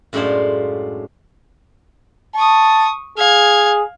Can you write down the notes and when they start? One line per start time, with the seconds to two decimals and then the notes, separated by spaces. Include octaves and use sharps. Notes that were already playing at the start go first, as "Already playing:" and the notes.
0.13 F#2 A2 G#3 D4 F4 C5
2.36 A5 C#6 D#6
3.18 G#4 F5 G#6